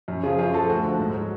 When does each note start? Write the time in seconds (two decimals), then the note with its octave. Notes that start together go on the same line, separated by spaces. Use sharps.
0.08 F#2
0.23 C#3 F3 F4 G#4
0.38 F#2 F4 G#4
0.54 F3 F#4 A4
0.69 D2 F#4 A4
0.84 D3 F3
0.99 G#2
1.14 F#3